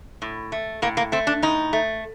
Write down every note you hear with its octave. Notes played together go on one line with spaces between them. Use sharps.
A2
A3
A2 A#3
A#3
A3 C4
D4
A2 D#4
A3